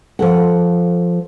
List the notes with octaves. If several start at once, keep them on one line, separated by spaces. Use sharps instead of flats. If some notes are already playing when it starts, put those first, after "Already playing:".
F3 A4 F#5